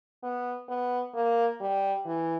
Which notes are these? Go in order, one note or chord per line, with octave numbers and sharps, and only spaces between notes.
B3
B3
A#3
G3
E3